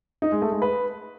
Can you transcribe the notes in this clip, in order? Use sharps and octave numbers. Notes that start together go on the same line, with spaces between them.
D#4
G#3
A3
G#3
B4